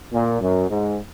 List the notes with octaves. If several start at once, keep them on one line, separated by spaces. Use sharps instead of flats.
A#2
F#2
G#2